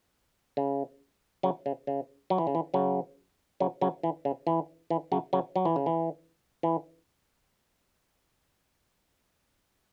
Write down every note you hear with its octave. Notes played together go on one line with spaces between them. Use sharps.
C#3
C#3 F#3
C#3
C#3
F#3
E3
C#3
E3
C#3 F#3
C#3 F#3
C#3 F#3
E3
C#3
E3
E3
C#3 F#3
C#3 F#3
F#3
E3
C#3
E3
E3